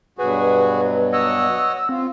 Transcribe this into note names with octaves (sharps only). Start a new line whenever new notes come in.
G2 B2 F#3 F#4 G#4 B4
C#5 D#5 F#5 E6
C4 F4